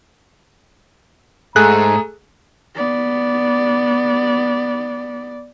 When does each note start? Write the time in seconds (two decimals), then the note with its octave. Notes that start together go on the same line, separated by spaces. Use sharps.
1.56 G#2 A3 G#4 A4 A#5 F#6
2.75 B3 D5